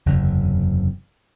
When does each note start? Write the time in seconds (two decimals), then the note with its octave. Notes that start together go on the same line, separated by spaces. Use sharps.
0.06 F#1 E2 C3